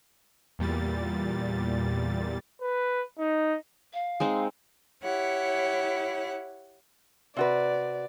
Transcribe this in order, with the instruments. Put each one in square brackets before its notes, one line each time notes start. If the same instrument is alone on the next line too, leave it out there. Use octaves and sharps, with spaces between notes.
[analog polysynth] E2 A#2 G3 A6
[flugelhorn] B4
D#4
[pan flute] F5
[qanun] G#3 C4 D#4
[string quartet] E4 G4 C#5 F#5
[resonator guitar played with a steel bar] C3 F#4 B4 [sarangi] D5